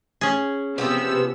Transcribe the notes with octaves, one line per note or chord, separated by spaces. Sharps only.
C#4 G#4
C3 F3 B3 C4 G4 E6